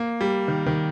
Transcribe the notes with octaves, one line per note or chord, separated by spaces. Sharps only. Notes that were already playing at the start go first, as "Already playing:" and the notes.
Already playing: A#3
G3
D#3
D#3